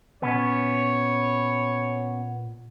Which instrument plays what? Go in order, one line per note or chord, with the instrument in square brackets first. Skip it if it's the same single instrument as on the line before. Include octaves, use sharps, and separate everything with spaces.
[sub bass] A#2 [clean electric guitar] B3 C#4 [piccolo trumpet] C#5